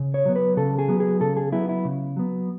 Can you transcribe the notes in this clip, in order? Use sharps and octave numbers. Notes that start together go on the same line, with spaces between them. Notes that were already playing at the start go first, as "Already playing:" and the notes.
Already playing: C#3
C#5
F#3 B3
B4
C#3 A4
G#4
F#3 B3
G#4
C#3 A4
G#4
F#3 B3 E4
E4
C#3
F#3 B3